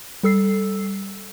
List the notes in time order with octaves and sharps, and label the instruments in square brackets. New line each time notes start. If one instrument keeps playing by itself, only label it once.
[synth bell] G3 A4 E6 C7